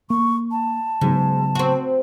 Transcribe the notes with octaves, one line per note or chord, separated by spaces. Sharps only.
A#3 C#6
A5
G#2 C#3 F#3 B3
C4 F#4